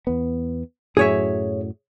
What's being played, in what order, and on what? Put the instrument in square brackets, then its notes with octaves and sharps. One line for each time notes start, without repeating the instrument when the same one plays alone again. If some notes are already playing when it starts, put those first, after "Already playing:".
[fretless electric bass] E2 B3
[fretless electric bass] F#2 A2 F#3 [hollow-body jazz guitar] G#4 C#5 E5